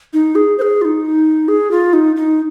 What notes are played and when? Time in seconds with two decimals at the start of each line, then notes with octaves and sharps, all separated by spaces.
0.13 D#4
0.35 G#4
0.58 C5
0.62 G#4
0.81 F4
0.85 D#4
1.48 G#4
1.71 F4
1.93 D#4
2.16 D#4